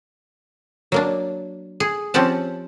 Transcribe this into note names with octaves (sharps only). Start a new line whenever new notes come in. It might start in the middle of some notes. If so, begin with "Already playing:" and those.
F#3 A#3 D4
G#4
F3 C4 C#4 G4 F#5 A5